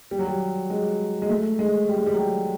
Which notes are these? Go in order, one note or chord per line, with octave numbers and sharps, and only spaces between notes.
G3
F#3
G3
G#3
G#3
A3
G#3
G3
G#3
G3
F#3
G3